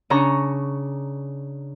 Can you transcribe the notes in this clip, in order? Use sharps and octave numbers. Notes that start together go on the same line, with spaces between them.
C#3 C#4 D4 A#5 C#6